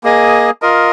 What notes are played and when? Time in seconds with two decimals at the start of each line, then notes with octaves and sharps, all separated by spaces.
0.04 A#3 G#4 D#5
0.62 F4 A#4 D#5